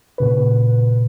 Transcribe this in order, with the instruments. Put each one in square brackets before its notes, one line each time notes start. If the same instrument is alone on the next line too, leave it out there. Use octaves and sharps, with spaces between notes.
[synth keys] A#2 C#3 B4